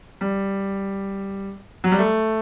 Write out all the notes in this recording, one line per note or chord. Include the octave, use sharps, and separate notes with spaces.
G3
F#3
G3
A3